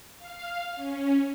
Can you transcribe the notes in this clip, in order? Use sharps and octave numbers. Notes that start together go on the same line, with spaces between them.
F5
C#4